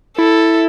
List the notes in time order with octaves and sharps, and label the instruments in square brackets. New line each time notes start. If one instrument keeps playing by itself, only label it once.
[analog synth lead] E4 [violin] A4